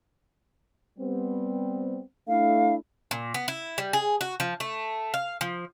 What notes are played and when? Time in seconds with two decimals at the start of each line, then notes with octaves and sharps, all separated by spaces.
0.98 G3 B3 C4
2.28 A3 D4 E4 F5
3.11 A#2
3.34 B3
3.48 E4
3.78 G3
3.93 G#4
4.21 F#4
4.40 F3
4.60 A3
5.14 F5
5.41 F3